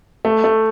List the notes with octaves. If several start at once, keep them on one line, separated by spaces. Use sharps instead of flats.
A3
A3